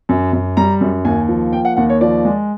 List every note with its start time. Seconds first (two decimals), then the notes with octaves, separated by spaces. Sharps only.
0.09 F#2
0.33 F#2
0.57 G3 A#5
0.81 F#2
1.05 D#2 G#5
1.29 F3
1.53 A#3 G5
1.65 F#5
1.76 D#2 F#5
1.90 C#5
2.01 F3 D5
2.25 G#3